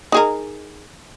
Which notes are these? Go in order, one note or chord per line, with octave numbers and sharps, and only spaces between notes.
D#4 G#4 A#4